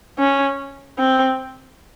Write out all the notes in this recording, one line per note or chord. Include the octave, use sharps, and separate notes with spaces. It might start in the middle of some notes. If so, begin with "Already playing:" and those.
C#4
C4